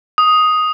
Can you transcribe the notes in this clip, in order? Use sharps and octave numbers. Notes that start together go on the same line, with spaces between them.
D#6